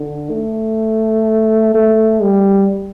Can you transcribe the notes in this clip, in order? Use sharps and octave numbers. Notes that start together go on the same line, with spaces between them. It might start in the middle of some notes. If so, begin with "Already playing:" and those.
Already playing: D3
A3
A3
G3